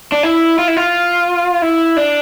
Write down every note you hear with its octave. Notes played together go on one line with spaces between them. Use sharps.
D4
E4
F4
E4
F4
E4
D4